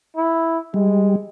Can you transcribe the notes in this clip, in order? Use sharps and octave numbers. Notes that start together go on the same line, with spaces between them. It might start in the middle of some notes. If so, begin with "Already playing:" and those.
E4
G3 G#3